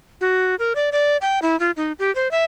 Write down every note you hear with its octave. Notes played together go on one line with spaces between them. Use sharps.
F#4
A#4
D5
D5
G5
E4
F4
D#4
G4
C5
E5